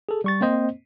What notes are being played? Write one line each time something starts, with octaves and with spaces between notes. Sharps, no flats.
G#4 A4
G3 C#6 A6
A#3 C4 C5 D#5